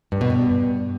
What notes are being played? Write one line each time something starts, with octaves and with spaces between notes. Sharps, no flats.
G2
B2
G2